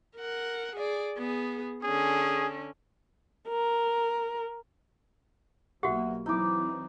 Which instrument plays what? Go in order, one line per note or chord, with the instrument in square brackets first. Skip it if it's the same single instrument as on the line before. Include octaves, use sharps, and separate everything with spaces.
[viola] A#4 F#5
G#4 D5
B3 G#4
[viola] D3 C#4 [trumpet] G#4
[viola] A#4
[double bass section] B1 F#3 A#3 [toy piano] F#4 G4 [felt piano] E5 F#5
[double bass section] E3 F#3 C4 [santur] D#4 D6 [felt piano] E4